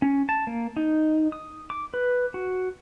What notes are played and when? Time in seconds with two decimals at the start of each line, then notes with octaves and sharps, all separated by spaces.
0.02 C#4
0.29 A5
0.47 A#3
0.77 D#4
1.32 D#6
1.70 D6
1.94 B4
2.34 F#4